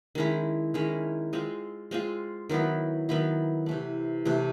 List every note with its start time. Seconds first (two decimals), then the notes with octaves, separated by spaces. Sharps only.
0.15 D#3 G#3 C#4 E4
0.74 D#3 G#3 C#4 E4
1.33 G#3 C4 F4
1.91 G#3 C4 F4
2.49 D#3 F#3 B3 E4
3.09 D#3 F#3 B3 E4
3.66 C3 E3 A3
4.25 C3 E3 A3